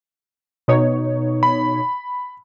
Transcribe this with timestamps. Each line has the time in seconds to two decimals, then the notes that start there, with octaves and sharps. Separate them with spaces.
0.68 B2 D#4 C#5
1.43 B5